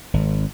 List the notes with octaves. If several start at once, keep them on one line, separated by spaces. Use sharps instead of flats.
G#1